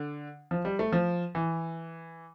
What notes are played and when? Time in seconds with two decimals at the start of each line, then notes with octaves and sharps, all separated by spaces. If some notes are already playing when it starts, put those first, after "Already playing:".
Already playing: D3
0.51 F3
0.65 G3
0.79 A3
0.92 F3
1.35 E3